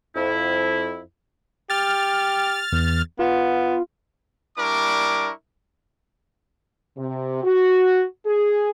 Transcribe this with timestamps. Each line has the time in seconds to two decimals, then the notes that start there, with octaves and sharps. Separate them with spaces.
0.16 F2 E4
1.70 G4 F6 A6
2.72 E2
3.19 B3 F4
4.58 G3 D4 E4 A#4 C#6 D6
6.97 C3
7.44 F#4
8.25 G#4